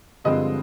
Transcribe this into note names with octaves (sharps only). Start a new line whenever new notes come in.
G2 D3 F3 G#3 C4 D#5